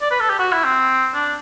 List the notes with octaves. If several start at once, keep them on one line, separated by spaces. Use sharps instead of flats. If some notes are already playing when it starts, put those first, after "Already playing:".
D5
B4
A4
G4
F#4
E4
C4
D4